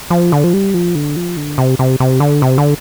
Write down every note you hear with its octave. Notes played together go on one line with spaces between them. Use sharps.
F3
D3
F3
G3
F3
D3
F3
D3
C3
C3
C3
D3
C3
D3